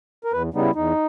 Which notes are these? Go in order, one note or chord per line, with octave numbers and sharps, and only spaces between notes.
A#4
E2 B4
C#3 G3 B3 D#4
E4
E2 D#4